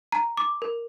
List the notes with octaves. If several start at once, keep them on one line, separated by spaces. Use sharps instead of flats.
A#5
D6
A#4